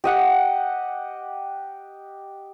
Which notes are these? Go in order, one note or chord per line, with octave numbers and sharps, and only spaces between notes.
G4 D#5 F#5